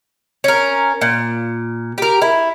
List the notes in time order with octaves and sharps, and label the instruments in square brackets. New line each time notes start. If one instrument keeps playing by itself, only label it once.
[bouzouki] C#4 A#4
A#2
G4 A#4
E4